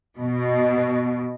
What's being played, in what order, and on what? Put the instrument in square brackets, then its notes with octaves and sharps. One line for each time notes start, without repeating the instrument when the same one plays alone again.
[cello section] B2